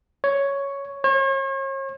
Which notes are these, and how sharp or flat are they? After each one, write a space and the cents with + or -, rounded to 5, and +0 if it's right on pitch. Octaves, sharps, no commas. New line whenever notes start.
C#5 +5
C#5 -40